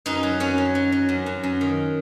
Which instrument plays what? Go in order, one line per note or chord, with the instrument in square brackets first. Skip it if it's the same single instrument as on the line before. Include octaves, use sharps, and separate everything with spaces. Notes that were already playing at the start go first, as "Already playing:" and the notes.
[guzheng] F#2 D#4
F#3
F#2 C#4
F#3
F#3
F#3
F#2
F#2
F#2
D#3